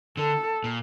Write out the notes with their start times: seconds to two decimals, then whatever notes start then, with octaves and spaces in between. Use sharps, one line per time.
0.17 D3 A4
0.64 A#2